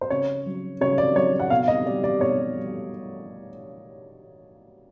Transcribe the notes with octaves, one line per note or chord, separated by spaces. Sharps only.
C5
C#3 C#5
F#3
C#3 C#5
D5
F#3 C#5
F#5
B2 F5
D#5
G3 D5
D5
B2 C#5
G3